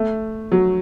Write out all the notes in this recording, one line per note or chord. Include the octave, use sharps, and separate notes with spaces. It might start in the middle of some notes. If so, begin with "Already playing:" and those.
Already playing: A3
F#3